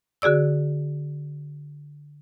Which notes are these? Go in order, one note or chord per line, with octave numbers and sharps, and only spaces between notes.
D3 F#4 G#4 D5 E6